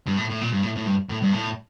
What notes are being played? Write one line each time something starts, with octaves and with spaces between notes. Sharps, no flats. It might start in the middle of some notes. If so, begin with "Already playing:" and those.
G2
A2
A2
A#2
G2
A2
A2
G2
A2
G2
A2